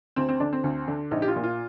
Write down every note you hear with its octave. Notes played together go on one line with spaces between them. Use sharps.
D2 C4
C4
D3 D4
C4
D2
D3
A#1 D#4
G4
F4
A#2
F4